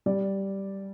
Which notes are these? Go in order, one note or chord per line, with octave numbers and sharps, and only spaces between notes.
G3 D5